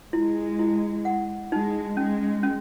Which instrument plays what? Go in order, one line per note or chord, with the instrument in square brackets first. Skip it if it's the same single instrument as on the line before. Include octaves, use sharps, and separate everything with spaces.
[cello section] G#3 [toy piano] E4
[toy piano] E4
F#5
[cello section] G#3 [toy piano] D#4
[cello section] G#3 [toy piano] C#4
[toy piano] C#4